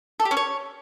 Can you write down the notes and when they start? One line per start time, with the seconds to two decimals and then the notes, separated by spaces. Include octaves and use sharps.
0.20 A4
0.25 G4
0.31 C#4
0.37 C#5